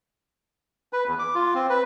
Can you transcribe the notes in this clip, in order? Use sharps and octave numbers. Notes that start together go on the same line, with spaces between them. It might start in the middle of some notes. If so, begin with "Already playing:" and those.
B4
E2
D6
F4
C4
B4